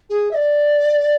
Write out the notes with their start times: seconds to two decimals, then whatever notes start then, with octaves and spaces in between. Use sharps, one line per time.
0.10 G#4
0.31 E5
0.34 D5